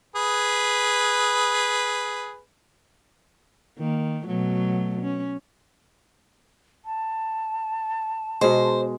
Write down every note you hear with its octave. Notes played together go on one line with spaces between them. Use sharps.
G#4 B4
D#3 A#3
B2 F#3 A3
C#4
A5
B2 G#3 C5